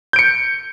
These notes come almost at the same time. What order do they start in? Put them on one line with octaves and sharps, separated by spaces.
G6 D7 C#7